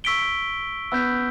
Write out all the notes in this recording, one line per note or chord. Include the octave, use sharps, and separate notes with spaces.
C#6 E6 B6 D7 G7
B3 E6 G6 B6